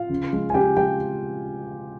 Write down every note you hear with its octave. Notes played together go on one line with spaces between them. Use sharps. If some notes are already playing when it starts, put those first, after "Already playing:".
Already playing: F4 F5
C#3
G#3
G#5
C#3 G4 G5
G#3 G4 G5